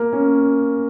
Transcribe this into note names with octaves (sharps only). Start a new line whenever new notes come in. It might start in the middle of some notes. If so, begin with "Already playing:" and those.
Already playing: A#3
C#4